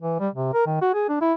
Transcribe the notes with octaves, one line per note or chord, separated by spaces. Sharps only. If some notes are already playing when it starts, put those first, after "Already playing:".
E3
G3
C3
A#4
D#3
F#4
G#4
D4
E4